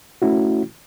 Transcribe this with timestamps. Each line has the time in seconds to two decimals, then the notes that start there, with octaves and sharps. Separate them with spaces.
0.22 A3 C#4 E4 F#4